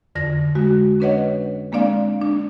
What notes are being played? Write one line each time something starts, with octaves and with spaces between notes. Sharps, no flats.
F2 D3 A#6
G#3 F#4
C#4 D4 B4 C#5 D#5 F#5
G#3 A#3 C4 D4 D5 F5
D4